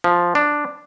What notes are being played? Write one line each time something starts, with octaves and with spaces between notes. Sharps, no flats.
F3
D4